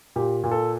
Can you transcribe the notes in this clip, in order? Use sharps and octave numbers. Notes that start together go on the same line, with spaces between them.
A#2 G4
A#2
A4